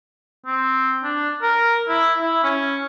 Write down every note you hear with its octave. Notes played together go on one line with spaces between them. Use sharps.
C4
D4
A#4
E4
E4
C#4